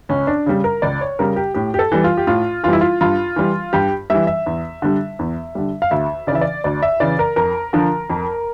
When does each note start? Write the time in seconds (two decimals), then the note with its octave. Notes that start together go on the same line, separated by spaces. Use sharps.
0.09 C#2 C#4
0.27 D4
0.46 C#3 G3
0.64 A#4
0.82 C#2 D5
1.01 C#5
1.19 C#3 G3 A#4
1.36 G4
1.54 A2 G4
1.74 G4
1.79 A4
1.92 E3 G3
2.04 F4
2.17 G4
2.27 A2 F4
2.64 E3 F4
2.68 G3 E4
2.81 F4
3.01 G2 F4
3.36 E3 G3
3.73 G2 G4
4.10 E3 G3 E5
4.27 E5
4.46 E2
4.82 D3 G3
5.19 E2
5.55 D3 G3
5.82 F5
5.91 D2 E5
6.27 C#3 D5
6.32 E3 E5
6.41 D5
6.64 D2 D5
6.82 E5
7.00 C#3 E3 D5
7.19 A#4
7.36 F2 A#4
7.73 D3 F3
8.10 F2